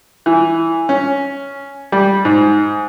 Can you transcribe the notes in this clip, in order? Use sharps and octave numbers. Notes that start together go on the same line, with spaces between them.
E3
C#4
G3
G#2